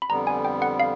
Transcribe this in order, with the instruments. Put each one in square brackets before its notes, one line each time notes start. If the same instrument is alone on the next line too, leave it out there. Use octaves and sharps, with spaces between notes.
[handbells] B5
[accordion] F2 D3 G3 B3 [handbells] A#5
[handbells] G#5
G5
F#5
F5